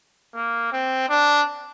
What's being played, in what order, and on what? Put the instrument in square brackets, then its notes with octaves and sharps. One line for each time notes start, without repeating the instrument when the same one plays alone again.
[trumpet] A#3
C4
D4